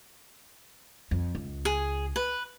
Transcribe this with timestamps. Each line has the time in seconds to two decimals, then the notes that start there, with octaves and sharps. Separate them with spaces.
1.11 F2
1.35 C#2
1.65 G#4
2.16 B4